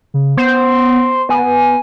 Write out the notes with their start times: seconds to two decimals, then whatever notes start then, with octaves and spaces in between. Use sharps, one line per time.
0.14 C#3
0.37 B3 C5
1.29 B3 G#5